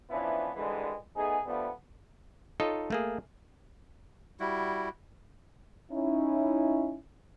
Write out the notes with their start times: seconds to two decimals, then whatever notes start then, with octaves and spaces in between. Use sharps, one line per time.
0.10 E3 F3 B3 C#4 D4 E4
0.56 G#1 D3 E3 G3 G#3
1.16 A3 B3 D#4 G#4
1.46 D3 F3 G3 A3 B3
2.60 D#4 F4 A4 C#5 D#5
2.91 A3 A#3 G#4
4.40 G3 E4 F#4
5.92 C#4 D#4 E4